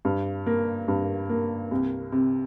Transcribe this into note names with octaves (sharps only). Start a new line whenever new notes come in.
G2
A#3
G2
A#3
C2
C3